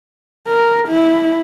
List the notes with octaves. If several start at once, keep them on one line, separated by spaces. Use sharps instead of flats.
A#4
E4